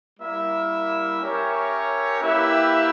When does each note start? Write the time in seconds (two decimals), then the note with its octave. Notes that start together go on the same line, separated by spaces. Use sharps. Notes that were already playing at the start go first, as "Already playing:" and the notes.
0.20 G3 A#3 E4 A#4 E5
1.20 C#4 G4 A#4 C#5 E5
2.21 A#3 E4 G4 B4 E5